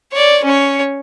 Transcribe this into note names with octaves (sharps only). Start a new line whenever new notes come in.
C#5 D5
C#4 C#5